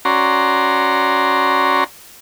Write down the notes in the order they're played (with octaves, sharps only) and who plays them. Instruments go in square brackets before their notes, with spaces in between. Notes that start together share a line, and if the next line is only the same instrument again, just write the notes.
[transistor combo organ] C#4 F#4 D5 A#5 C6